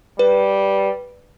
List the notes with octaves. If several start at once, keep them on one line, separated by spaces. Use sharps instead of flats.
G3 B4